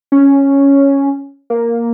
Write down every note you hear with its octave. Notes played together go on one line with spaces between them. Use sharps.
C#4
A#3